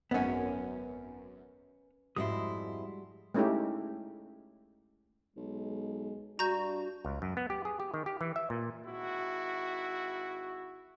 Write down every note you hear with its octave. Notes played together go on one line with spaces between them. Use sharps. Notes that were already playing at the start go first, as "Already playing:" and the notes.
G#1 F#2 B3 C#4
F2 G#2 G3 G#3 E4 F#4 C6 D#6
G#3 A3 C#4 D#4 E4 G4
B1 G#3
G2 D4 F#4 A#5 G6
C#2
F#2
B3
G4
G#4
G4
D#3
G4
E3
E5
A#2
G#1 E4 F#4